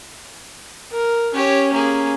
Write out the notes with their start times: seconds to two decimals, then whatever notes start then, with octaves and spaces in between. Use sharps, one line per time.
0.92 A#4
1.34 C#4 G4 C#5
1.73 A#3 G#4